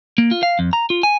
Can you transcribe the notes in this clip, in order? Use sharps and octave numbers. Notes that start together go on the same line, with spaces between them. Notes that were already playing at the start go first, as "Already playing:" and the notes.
A#3
F4
F5
F2
A#5
F4
G#5